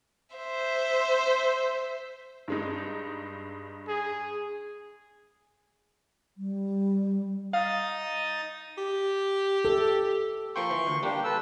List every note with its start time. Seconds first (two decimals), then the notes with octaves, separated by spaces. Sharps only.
0.35 C5 E5
2.48 G2 G#3 D#4
3.88 G#4
6.37 G3
7.53 D#4 F5 D#6 A6
8.78 G4
9.65 A4
10.56 F3 A#3 G5 C6 C#6
10.71 E3
10.87 D2
11.03 G3 A#3 D4 G4
11.24 A4 B4 E6